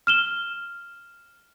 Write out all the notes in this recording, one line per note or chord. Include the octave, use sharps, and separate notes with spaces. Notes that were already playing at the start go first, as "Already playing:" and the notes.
F6 E7 G7